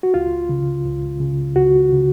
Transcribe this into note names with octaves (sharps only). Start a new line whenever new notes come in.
F#4
C#2 F4
C#3
C#2
C#3
C#2 F#4
C#3